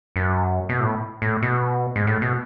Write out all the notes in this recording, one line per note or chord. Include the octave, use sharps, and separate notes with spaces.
F#2
B2
A2
A2
B2
G#2
A2
B2